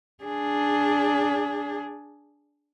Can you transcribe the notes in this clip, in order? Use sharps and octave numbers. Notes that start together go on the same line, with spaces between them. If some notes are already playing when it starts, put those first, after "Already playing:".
D4 G#4